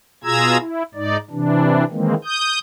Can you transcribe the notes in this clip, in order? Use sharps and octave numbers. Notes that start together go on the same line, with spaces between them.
B2 F4 G#4 A#5 E6 G#6
E4
G#2 D#4 D5
C3 E3 D4
D#3 E3 G#3 A#3 C4
D#6 G6